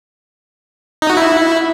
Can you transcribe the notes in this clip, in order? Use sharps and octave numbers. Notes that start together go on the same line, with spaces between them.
D#4
F#4
E4